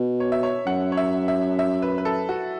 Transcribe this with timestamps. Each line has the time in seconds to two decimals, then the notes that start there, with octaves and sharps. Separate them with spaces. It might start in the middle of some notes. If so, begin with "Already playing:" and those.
Already playing: B2
0.20 C#5
0.32 E5
0.43 C#5
0.66 F#2 F#5
0.92 C#5
0.97 E5
1.28 E5
1.59 E5
1.82 B4
1.98 B4
2.05 A4
2.29 F#4